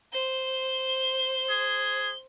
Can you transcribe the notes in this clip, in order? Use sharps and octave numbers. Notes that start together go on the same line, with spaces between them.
C5 G7
G#4